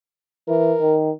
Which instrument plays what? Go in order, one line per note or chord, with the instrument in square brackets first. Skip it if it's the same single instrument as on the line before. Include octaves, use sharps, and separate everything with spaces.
[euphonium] E3 [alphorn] A#4
[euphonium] D#3